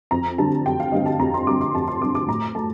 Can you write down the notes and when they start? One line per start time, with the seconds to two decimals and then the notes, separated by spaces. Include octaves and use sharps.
0.11 F2 A#5
0.38 D3 G3 C4 A5
0.66 F2 G5
0.80 F5
0.92 D3 G3 C4 D#5
1.06 A5
1.19 F2 A#5
1.34 C6
1.47 D3 G3 C4 D6
1.61 C6
1.73 F2 A5
1.88 C6
2.01 D3 G3 C4 D6
2.15 D6
2.28 A2 A#5
2.55 A3 A5